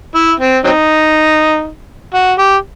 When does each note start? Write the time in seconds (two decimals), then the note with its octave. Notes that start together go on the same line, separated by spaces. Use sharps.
0.14 E4
0.39 C4
0.64 F#3 C4 D#4
2.14 F#4
2.39 G4